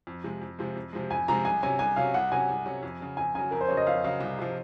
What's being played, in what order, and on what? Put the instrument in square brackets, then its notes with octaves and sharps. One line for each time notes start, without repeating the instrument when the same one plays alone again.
[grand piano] F2
C3 F3 G#3
F2
C3 F3 G#3
F2
C3 F3 G#3
[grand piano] F2 [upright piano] G#5
[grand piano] C3 F3 G#3 [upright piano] A#5
[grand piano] C2 [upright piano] G#5
[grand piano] C3 F#3 C#4 [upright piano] G#5
[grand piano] C2 [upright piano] G#5
[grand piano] C3 F#3 C#4 [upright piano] F5
[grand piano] C2 [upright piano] F#5
[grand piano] C3 F#3 C#4 [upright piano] G#5
[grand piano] C2
C3 F#3 C#4
F2
C#3 F#3
[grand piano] F2 [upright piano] G#5
[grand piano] C#3 F#3 [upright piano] G#5
[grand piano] F2 [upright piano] A#4
[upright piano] C5
[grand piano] C#3 F#3 [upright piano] C#5
[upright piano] D#5
[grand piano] F2 [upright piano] F5
[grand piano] C#3 F#3 [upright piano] F5
[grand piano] C2
C3 F3